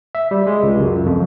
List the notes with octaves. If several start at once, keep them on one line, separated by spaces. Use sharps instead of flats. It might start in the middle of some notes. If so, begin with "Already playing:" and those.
E5
G3
G#3
C#2
F#2
F2